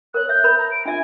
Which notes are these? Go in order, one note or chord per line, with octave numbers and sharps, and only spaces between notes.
A#4 C#5 F#6
E5 G6
A#4 C5 B5
A#5
D7
D4 F4 E5 G#5